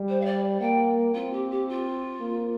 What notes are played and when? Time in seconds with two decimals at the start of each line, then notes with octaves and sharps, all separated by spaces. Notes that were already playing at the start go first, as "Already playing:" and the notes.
Already playing: G3
0.08 C5
0.20 F5
0.25 D5
0.61 A#3 G5
1.14 C4 F4
1.32 G4
1.50 G4
1.68 F4
2.20 A#3